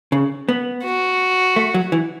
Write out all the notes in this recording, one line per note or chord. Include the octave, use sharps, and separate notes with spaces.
C#3
B3
F#4
A3
F#3
E3